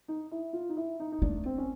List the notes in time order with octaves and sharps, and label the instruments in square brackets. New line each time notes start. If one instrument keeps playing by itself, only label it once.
[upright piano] D#4
E4
F4
D#4
E4
D#4
D#4
[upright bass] A3 [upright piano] D4
[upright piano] C4
C#4